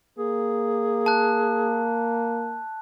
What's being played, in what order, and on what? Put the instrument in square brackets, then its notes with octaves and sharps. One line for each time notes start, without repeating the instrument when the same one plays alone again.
[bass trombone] A#3 [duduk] G#4
[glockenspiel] A5 F#6